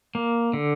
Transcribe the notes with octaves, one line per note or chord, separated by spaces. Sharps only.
A#3
D3